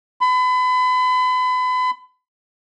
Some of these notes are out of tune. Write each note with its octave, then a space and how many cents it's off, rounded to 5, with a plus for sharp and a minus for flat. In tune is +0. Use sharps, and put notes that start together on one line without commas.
B5 +35